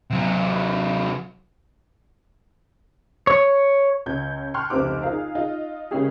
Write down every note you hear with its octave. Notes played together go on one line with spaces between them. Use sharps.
C3 F#3
C#5
C#2 C#4 G6 G#6
G5 A5 C6 C#6 F6 F#6
F1 C#2 C3 C5 D6
D#4 F4 G#4 A#4 F5
D#4 F4 D#5
C#3 G#3 A#3 C#4 G4 G#4